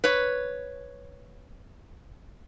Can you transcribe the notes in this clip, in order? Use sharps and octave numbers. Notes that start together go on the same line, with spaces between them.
B4 C#5